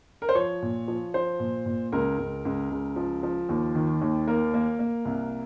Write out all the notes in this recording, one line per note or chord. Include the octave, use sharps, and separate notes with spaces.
A#4
C5
F3 C#5
A#2
F3
F3 C5
A#2
A#2
C#2 A#4
C#2
C#2
C#2
F3
F3
D#2
D#3
D#2
A#3 A#4
A#3
A#3
C2